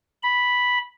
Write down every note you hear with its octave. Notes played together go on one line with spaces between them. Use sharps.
B5